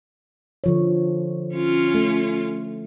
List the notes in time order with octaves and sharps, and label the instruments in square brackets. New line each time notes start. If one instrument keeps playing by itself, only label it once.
[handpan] D3 F3 C#5
[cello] C#4 F4
[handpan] A3